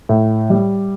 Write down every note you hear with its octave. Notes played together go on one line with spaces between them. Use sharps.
A2
G3